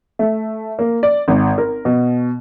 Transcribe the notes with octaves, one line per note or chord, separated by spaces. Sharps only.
A3
A#3
D5
G#1
A#4
B2